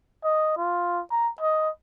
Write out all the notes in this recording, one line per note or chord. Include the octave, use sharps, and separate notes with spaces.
D#5
F4
A#5
D#5